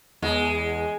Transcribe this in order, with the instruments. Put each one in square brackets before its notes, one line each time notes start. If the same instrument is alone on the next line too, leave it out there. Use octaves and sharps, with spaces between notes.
[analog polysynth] E2 [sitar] G#3